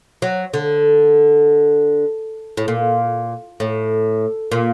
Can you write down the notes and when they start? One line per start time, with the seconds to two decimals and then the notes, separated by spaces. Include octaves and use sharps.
0.22 F#3
0.54 D3
2.57 A2
2.68 A#2
3.60 A2
4.52 A#2